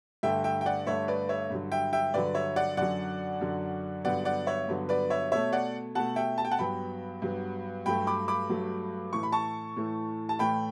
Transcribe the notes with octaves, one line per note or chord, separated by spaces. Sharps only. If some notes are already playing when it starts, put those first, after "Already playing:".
G2 D3 A3 E5 G5
E5 G5
G5
D5 F#5
G2 D3 A3 C#5 E5
B4 D5
C#5 E5
G2 D3 F#3
E5 G5
E5 G5
G2 D3 F#3 B4 D5
C#5 E5
D5 F#5
F#2 D3 F#3 D5 F#5
F#2 D3 F#3
G2 D3 F#3 B3 D5 F#5
D5 F#5
C#5 E5
G2 D3 F#3 B3
B4 D5
C#5 E5
B2 A3 C#5 E5
D5 F#5
B2 A3 F#5 A5
E5 G5
A5
G5
F#5 A5
G2 F#3 B3 G5 B5
G2 F#3 B3
G2 F#3 A3 G5 B5
B5 D6
B5 D6
G2 F#3 A3
A2 E3 A3 C#6
B5
A5 C#6
A2 E3 A3
A5
A2 E3 A3 G5 B5